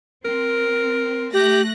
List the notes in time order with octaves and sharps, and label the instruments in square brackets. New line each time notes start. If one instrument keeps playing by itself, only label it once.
[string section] C4 [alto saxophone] A#4
[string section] A3 F#6 A#6 [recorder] G4